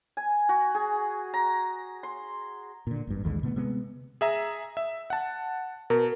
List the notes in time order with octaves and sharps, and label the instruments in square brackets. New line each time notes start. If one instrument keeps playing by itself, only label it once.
[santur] G#5
F#4
G#4
A#5
C6
[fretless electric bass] A#2 D3
G#1 G2
A1 D#2 D3 G#3
B2 D3 A3 B3
C3 G#3 B3
[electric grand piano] G#4 E5 A#5
E5
F#5 A5
[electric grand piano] B2 [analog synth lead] A#4